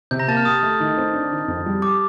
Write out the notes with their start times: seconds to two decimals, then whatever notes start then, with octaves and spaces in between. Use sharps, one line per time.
0.11 C3 G6
0.19 A#5 A#6
0.28 A#3 A5 A6
0.37 F6
0.45 G4 D#6
0.63 A3
0.80 D#3
0.98 C4
1.13 D4
1.32 D#3
1.48 F2
1.66 G3
1.82 G4 D6